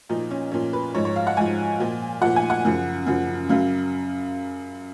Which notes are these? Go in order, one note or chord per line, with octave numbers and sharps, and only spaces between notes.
A#2 F3 D#4
C#4
A#2 F3 C#4
B4
G#2 F3 C#5
C#5
F5
F#5
G#2 F3 G#5
A#2 F3
A#2 F3 F#5
G#5
F#5
F#2 C#3 F3
F#2 C#3 F3
F#2 C#3 F#3 F5